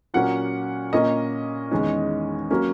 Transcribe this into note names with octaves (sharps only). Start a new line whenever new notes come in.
A#2 F#3 A#3 C#4 F#5
A#2 A#3 C#4 D#5
E2 D#3 G#3 C#4
F#3 A#3 C#4